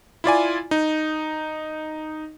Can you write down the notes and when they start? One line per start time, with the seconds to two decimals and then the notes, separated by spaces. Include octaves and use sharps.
0.24 E4 F4 D5 G#5
0.71 D#4